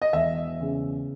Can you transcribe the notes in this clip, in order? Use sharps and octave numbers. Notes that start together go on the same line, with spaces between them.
D#5
E1 E5
C#3